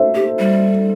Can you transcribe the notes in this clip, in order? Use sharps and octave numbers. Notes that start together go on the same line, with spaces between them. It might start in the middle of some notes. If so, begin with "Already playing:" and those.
Already playing: A4 C5 E5
G4
G3